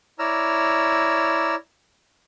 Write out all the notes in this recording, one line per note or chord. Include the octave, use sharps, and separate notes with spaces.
E4 C#5 D5 A#5 E6 F6